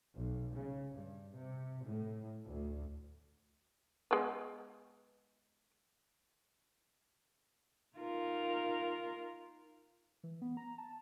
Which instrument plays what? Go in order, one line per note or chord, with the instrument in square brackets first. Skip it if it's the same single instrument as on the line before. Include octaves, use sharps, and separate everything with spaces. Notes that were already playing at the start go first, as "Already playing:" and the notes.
[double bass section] B1
C#3
G2
C3
A2
D2
[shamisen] G#3 B3
[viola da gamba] D#4 F4 A#4
[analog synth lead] E3
B3
A#5
A5